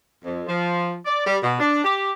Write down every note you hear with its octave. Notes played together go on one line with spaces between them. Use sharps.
F2
F3
D5
G3
B2
D4
G4